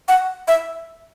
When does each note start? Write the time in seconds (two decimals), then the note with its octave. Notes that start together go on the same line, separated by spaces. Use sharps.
0.08 F#5
0.48 E5